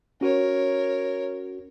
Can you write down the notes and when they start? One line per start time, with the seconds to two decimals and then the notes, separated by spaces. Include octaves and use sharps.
0.21 C#4 F#4 A#4 C#5